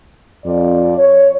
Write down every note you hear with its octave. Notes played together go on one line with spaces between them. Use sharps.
F2 F4 D5
C#5